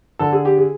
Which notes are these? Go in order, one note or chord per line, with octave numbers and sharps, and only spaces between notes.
D3 A4
G#4
G4
G#4